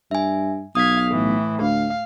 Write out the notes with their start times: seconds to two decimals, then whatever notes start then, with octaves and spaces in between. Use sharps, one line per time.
0.11 G2 E5 G#5
0.75 B1 F5 D#6 G#6 B6
1.11 A2 E3
1.61 D2 F5